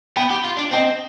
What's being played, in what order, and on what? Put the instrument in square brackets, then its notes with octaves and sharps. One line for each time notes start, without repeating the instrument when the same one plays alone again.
[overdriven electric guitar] B3 [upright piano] G5 B5
[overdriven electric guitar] G4
F4
D4
[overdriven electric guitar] C4 [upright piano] D#5 G5